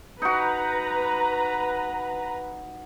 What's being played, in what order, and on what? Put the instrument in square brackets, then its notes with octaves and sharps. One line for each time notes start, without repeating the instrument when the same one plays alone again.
[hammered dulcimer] D#4 F#4 [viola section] B4 A#5